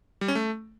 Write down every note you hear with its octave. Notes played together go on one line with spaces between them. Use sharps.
G3
C#4
A3